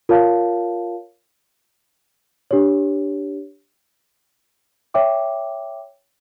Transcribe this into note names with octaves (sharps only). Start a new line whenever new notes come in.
F4 A#4 C#5 F5 A5
D4 G4 C#5
C#5 E5 G5 D6